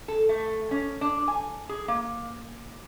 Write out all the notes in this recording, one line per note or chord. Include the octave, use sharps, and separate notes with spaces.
A4
A3
C#4
D4
G#5
G#4
A#3